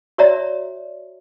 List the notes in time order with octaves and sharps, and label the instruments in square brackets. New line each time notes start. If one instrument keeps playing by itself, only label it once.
[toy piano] F#4 C#5 D5 E5 A#5